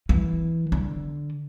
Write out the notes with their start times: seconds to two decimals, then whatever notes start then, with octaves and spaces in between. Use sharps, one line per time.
0.09 E3
0.72 D3